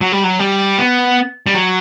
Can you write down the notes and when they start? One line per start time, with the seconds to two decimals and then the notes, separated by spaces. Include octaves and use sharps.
0.01 F#3
0.12 G3
0.24 F#3
0.39 G3
0.78 B3
1.47 G3
1.54 F#3